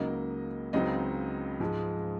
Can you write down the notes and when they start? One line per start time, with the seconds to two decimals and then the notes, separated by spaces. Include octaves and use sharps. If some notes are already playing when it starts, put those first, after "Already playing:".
Already playing: C#2 C#3 F#3 A#3 D#4 D#5
0.73 C#2 C#3 F#3 C4 D#4 D#5
1.60 G#2 F3 G#3